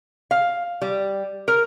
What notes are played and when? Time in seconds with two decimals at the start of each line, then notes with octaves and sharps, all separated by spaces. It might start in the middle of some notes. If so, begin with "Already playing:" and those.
0.31 F5
0.82 G3
1.48 A#4